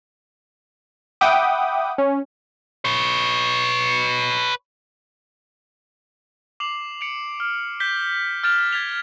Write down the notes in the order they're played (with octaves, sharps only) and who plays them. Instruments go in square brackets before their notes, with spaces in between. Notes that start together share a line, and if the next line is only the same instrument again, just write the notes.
[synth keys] E5 F#5 G5 B5 D6 D#6
C#4
[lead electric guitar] B4 C#5
[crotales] D6 C7 F7 F#7
C#7 D7 F7
F6
G6 B6 G7
F6 G6 A6 D7 E7 F7
G#6 A6 B6 F7 G7